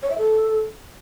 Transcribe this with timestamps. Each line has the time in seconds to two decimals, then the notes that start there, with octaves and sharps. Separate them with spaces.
0.02 C#5
0.10 E5
0.18 A4